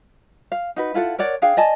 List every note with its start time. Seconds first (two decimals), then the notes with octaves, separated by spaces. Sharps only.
0.52 F5
0.76 D#4 F#4 B4
0.94 E4 F4 A4 F#5
1.19 A#4 C#5 D5 F#5
1.42 D4 G#4 F5 G5
1.57 D5 D#5 G#5 A5